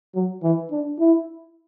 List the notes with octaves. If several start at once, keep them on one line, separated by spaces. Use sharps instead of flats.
F#3
E3
D4
E4